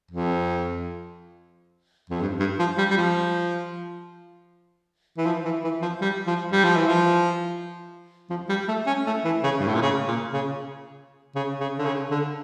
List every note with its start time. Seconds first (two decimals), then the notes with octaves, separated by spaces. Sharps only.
0.11 F2
2.10 F2
2.21 G2
2.39 G2
2.59 F3
2.78 G3
2.91 G3
2.97 F3
5.18 E3
5.26 F3
5.45 E3
5.64 E3
5.82 F3
6.01 G3
6.27 F3
6.52 G3
6.64 F3
6.76 E3
6.87 F3
8.30 F3
8.49 G3
8.68 A3
8.87 C#4
9.06 A3
9.25 E3
9.44 C#3
9.61 G2
9.68 A2
9.75 A#2
9.82 C#3
10.07 A#2
10.33 C#3
11.35 C#3
11.60 C#3
11.78 D3
11.85 C#3
12.11 D3